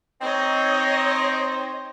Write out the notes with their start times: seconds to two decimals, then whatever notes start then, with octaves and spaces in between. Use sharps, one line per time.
0.22 C4 D#4 C#5 D#5